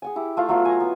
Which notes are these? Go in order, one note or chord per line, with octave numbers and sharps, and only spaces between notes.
G#4 F#5 G#5
E4 G4
A3 F4 F5 D#6
F#3 A3 B3 F4
G#5 A#5
B3 E4